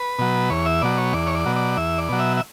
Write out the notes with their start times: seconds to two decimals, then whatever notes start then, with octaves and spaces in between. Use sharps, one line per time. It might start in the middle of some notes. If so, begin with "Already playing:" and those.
Already playing: B4
0.19 B2 F#3
0.50 E2 C#5
0.66 E5
0.82 B2 F#3 D5
0.98 C#5
1.13 E2 D5
1.27 C#5
1.35 D5
1.46 B2 F#3
1.56 D5
1.77 E2 E5
1.98 D5
2.09 B2 F#3
2.19 E5
2.37 E5